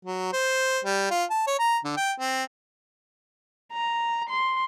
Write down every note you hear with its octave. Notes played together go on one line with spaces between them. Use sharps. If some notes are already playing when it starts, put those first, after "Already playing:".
F#3
C5
G3
F4
A5
C#5
A#5
D3
G5
C4
A#5
C6